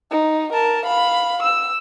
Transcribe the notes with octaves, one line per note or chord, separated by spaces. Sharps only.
D#4
A#4 A5
F5 B5
E6